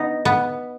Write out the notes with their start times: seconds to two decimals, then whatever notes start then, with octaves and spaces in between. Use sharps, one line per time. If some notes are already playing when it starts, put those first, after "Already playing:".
Already playing: B3 D#4
0.25 B3